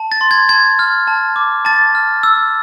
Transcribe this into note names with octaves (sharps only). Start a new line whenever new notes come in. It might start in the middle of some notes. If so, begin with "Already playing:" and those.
Already playing: A5
A6
C6
G#6
A5 G#6
F6
A5
D6
A5 A6
F6
E6